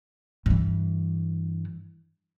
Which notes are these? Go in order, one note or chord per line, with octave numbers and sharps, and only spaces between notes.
G2 E3